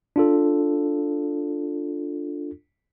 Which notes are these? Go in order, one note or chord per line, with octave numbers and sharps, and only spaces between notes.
D4 F4 A4